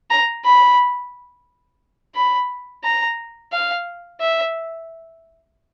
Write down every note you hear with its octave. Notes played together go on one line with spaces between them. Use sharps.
A#5
B5
B5
A#5
F5
E5